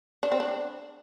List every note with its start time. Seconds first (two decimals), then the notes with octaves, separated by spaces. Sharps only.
0.23 D4
0.32 C4
0.40 D4